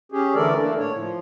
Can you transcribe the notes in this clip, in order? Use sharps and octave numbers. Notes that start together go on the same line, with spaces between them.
C#4 G4 G#4
D3 E3 A3 A4 A#4 D5
A3 A#3 D4
A2 C#5
F3